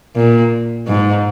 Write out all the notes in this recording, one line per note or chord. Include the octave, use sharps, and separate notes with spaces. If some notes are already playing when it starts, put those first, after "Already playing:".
A#2
G#2